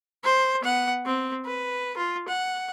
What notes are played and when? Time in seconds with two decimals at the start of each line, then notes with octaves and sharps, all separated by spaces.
0.24 C5
0.62 B3 F#5
1.06 C4
1.45 B4
1.97 F4
2.28 F#5